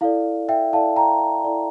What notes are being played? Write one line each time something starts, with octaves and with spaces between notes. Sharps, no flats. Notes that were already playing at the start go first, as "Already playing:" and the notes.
E4 A4 D5 F5
E5 G5
E4 A4 D5 F5 A5
G5 A#5
E4 A4 D5